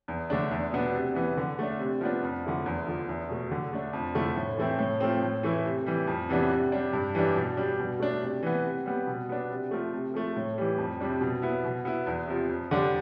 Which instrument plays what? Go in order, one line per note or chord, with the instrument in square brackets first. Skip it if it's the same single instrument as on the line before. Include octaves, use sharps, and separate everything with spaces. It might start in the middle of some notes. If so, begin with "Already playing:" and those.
[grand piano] E2
D3 A3 D4
E2
B2 B3 D4
C3
E3 B3
D3
A3 D4
C3
F3 B3 D4
F2
D3 A3 E4
E2
D3 F3
E2
B2 A3
D3
A3 D4
F2
D3 F3 A3 E4
A2
E3 A3 C4 E4
A2
F3 A3 C4
A2
E3 A3 E4
C3
E3 G3
F2
C3 E3 B3 D4
C3
G3 D4
G2
E3 G3 D4
B2
G3 D4
B2
A3 D4
C3
E3 B3
C3
G3 B3
B2
B3 D4
C3
F3 A3
C3
F3 A3
A2
E3 G3
F2
C3 G3 D4
B2
B3 E4
B2
B3 E4
E2
C3 F3
F2
D3 G3 D4